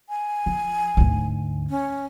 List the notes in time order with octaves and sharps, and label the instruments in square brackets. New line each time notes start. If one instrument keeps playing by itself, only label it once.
[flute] G#5
[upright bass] F3
D2 G#2
[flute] C#4